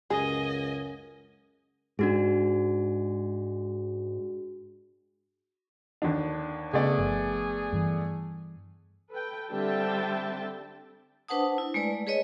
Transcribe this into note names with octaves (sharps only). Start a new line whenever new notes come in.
C#2 F#2 G#4 D#5 G#5
G#2 D4 F#4 G#4
D#2 D3 D4
C#3 A3 B3 G#4 D5
G1 F3
G2 E3
A4 B4 G5
D3 G3 C4 E5 G5 A5
D4 B4 C5 F#5 A5 D#6
E4
G#3 A3 B4 D5
G#4 B4 C#5 D#5